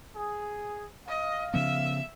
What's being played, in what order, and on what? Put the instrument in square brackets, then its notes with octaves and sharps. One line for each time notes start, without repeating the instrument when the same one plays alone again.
[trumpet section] G#4
[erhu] D#5 [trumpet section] F5
[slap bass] C#3 F3 B3 [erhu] E5